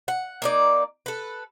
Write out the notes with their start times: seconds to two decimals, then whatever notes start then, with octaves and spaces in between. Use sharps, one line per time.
0.08 F#5
0.42 A#3 D#4 D5
1.06 A4 B4